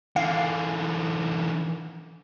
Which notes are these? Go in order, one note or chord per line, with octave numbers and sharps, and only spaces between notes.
D3 E3 F5